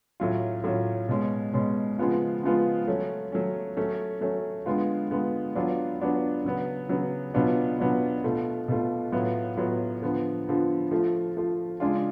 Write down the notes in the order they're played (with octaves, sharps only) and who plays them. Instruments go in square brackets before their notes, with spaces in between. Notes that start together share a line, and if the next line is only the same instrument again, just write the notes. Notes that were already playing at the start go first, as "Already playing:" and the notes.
[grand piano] A2 F#3 C#4 F4
A2 F#3 C#4 F4
B2 G#3 C#4
B2 G#3 C#4
C#3 F3 G#3 B3 F4
C#3 F3 G#3 B3 F4
F#3 A3 C#4
F#3 A3 C#4
F#3 A3 C#4
F#3 A3 C#4
D3 G#3 B3 F4
D3 G#3 B3 F4
F#3 B3 D4 F4
F#3 B3 D4 F4
C#3 F#3 B3
C#3 F#3 B3
B2 F#3 B3 D4 F4
B2 F#3 B3 D4 F4
B2 A3 F4
B2 A3 F4
A2 F#3 B3 F4
A2 F#3 B3 F4
D3 F3 B3
D3 F3 B3
F3 A3 F4
F3 A3 F4
C#3 G#3 D4 F4